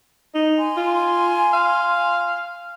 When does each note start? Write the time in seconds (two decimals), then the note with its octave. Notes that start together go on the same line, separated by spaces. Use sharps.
0.35 D#4
0.58 G#5 C6
0.77 F4
1.53 F5